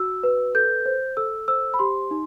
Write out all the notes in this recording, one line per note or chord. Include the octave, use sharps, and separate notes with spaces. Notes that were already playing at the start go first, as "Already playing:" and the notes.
Already playing: F#4 E6
B4
A4 G6
C5
A4 E6
C5 E6
B5
G4 C6
D#4